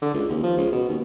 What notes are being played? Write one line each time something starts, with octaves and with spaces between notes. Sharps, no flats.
D3
C#2
D#2
F3
C#2
B2
D#2